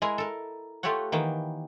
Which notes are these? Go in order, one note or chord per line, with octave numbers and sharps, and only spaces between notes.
G#3 E4 G#4 A#4
A4 A#4
A3 F4 G4 A4 C#5 F#5
D#3 E3 A#3 B3 G5